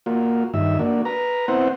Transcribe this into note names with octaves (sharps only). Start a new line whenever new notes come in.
A#3 F4 F#4
G2 D#3 E5
A#3 D4 F#4
B4 A#5
B3 C4 E4 C5 F#5